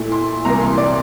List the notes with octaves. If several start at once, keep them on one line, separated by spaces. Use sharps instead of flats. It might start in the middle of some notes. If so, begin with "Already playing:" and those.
Already playing: A#2 A3 E4
C6
C2 C3 E3 A#3 A#5
C6
D5